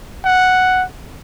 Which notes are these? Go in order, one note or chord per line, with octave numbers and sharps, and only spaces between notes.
F#5